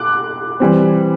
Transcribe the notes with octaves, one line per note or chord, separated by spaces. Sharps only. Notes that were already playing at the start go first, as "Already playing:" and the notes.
Already playing: D6 F#6
E3 G3 C4